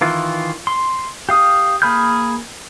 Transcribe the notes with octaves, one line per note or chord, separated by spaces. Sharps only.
D#3 E3 F4
C6
G4 F5 D#6
A#3 G#4 B5 F6 G6